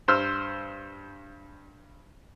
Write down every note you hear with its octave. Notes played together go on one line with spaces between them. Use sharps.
G2 C5 E6 F6